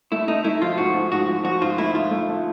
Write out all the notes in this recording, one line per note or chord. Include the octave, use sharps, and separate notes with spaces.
A3 E4
A3 D#4
A3 E4
F3 F4
G#2 F#4
G#2
G#2 F#4
F3
F3 F#4
G#2 F4
A3 E4
G#2 F4
A3
A3